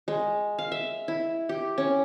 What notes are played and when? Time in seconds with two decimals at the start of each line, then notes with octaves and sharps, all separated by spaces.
0.08 G#3
0.59 F5
0.72 E5
1.08 E4
1.49 G4
1.78 C#4